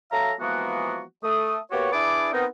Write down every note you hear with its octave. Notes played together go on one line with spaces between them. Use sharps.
F#3 A4 E5 F5 A#5
E3 F3 G#3 A#3 B3 F#4
A3 D#6
A#3 B3 F#4 G4 C#5
D4 E4 G#4 B4 D5 D6
B3 C4 D#4 A#4